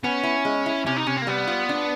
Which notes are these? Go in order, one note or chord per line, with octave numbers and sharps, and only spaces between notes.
B3 C#4
E4
G#3
E4
C3 C#4
D#4
C3 C#4
C4
A#3
G3 B3
F4
D4